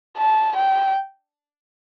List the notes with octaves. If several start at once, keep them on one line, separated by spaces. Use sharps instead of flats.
A5
G5